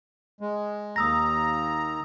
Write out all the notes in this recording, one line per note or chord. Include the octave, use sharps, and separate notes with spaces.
G#3
D#2 A#5 D#6 E6 A#6